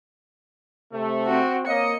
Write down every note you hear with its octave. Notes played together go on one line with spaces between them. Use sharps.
C3 A3
C4 F#4
A#3 C#5 D#5 C#7